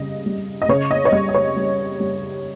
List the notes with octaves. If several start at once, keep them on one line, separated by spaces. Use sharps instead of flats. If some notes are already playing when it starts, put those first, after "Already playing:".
Already playing: C#3 G3 D#5
G3
D#5
C#3 C#5
D#5
C#5
G3 D#5
D#5
C#5
G3
G3